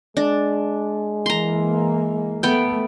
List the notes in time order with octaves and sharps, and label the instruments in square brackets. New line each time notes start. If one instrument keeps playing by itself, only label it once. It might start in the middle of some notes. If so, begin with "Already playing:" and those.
[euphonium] G#3 [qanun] D4
[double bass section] E3 A#3 [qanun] A#5 C6
[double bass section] A3 [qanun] B3 G5